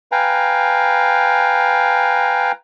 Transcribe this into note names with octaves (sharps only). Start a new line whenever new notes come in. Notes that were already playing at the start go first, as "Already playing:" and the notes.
B4 F5 G5 G#5 A#5